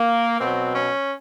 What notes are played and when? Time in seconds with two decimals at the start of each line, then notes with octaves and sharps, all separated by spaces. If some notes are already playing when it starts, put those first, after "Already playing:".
Already playing: A#3
0.41 B2 F#3 C4
0.75 C#4